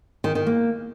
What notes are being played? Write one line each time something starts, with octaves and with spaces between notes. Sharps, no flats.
D#3
D#3
A#3